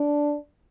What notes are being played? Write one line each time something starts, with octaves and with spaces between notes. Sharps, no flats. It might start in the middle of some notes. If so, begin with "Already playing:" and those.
Already playing: D4